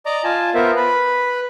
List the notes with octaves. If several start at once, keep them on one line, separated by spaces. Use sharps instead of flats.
D5 D#5 A#5 D6
F4 G#5 A5
B3 F4 A#4 C5 E5
B4 B5